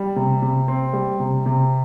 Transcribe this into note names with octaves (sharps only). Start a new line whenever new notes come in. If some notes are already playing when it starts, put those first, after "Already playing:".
Already playing: G3
C3
C3
C4
G3
C3
C3